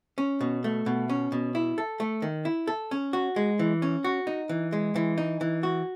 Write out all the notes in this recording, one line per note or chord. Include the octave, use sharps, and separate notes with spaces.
C#4
B2
A3
B2
C#4
B2
E4
A4
A3
D#3
E4
A4
C#4
F#4
G#3
E3
C#4
F#4
D#4
E3
G#3
E3
D#4
E3
F#4